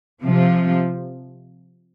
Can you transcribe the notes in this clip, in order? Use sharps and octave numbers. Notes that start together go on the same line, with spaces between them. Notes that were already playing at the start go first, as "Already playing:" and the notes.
C3 F3